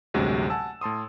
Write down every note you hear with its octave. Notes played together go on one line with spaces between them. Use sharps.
A1 D2 G2 C3 F#3 G#3
F#5 G#5 A5 E6
A2 A5 C6 D#6